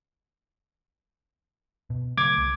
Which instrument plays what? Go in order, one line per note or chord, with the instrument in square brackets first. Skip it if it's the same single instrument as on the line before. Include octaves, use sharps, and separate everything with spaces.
[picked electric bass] B2
[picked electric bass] C#3 F#3 A3 [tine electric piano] D6 G#6
[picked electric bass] C2